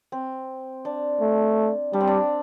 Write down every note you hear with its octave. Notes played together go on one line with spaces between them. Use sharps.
C4
D4
A3
G3 D4
C4
D4